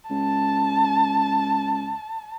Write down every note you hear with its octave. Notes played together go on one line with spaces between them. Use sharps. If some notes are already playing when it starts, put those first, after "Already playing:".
C#2 A5